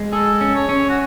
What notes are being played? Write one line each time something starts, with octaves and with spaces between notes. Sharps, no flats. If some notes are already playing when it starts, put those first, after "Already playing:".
Already playing: G#3
G#4 A4
C#4
C#5
C#4
F#4